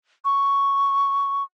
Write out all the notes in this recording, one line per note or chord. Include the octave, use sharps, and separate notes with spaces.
C#6